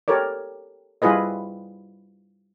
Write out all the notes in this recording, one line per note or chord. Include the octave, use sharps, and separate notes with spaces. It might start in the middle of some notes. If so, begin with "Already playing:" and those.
G4 A4 A#4 C#5 D5
G3 E4 F4 G#4 B4 D#5